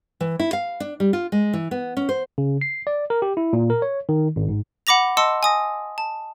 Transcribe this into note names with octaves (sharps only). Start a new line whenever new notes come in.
E3
E4
F5
D4
G3
F4
G#3
E3
B3
C#4
C5
C#3
C7
D5
A#4
G4
E4
A#2
A#4
C#5
D#3
G#1
G#2
F#5 B5 D6 A#6 F7
D#5 A5 C6 D6 E6 C#7
G#5 D#6 A#6
A5